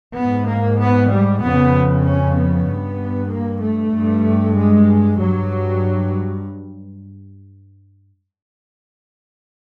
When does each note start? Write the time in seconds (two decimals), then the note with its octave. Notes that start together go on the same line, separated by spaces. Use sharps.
0.16 G#2 B3
0.48 A#3
0.79 B3
1.10 G3
1.42 F2 C#3 B3
2.04 C#4
2.35 B3
2.66 G2
3.29 A#3
3.60 A3
3.92 G2
4.54 G#3
5.17 G2 F#3